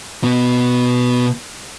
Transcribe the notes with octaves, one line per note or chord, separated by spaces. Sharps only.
B2 B3